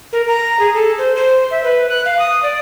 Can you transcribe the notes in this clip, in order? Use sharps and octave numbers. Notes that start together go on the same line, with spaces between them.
A#4
A#5
G#4
A4
C5
C5
E5
B4
F#6
F5
D#6
D5